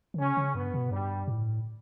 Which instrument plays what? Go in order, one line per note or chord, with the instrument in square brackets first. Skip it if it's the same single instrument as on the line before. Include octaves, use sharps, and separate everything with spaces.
[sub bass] D3
[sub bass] C#3 [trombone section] C#4
[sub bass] C#3
[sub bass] G2 [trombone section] B3
[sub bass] B2
[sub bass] G2 [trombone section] G3
[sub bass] A2